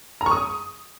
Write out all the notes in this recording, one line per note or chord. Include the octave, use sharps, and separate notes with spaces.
A#5
C#6
D#6